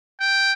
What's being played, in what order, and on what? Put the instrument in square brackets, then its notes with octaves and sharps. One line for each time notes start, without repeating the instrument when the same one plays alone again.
[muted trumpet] G5